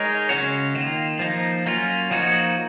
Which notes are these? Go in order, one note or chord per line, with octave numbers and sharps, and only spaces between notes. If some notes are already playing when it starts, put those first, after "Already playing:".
Already playing: G#3 D#4 A#4 C#5
C#3 G#3 C#4 F#4 C#5
D#3 A#3 F4
F3 A#3 D#4
F#3 A#3 C#4 F4
F3 A#3 D#4 F#4 C#5